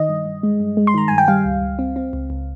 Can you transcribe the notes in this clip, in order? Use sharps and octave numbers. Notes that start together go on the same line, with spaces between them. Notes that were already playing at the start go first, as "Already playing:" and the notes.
Already playing: D#3 D#5
G2
G2
G#3
G2
G#3
C6
D#3 A#5
G2 G#5
G5
G3 F5
C#2
C#2
C4
C4
C#2
C#2